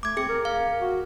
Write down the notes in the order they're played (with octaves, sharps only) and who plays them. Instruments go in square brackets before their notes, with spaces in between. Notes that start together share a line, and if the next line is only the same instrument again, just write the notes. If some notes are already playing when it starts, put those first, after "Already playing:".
[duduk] A3 [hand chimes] D6 G#6
[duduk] C4 [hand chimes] G#4 C#7
[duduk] A#4
[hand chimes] F5
[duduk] F#4